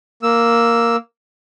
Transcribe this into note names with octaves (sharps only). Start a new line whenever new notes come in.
A#3 E6